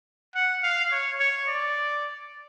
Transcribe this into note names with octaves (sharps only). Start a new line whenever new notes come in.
F#5
F5
C#5
C#5
D5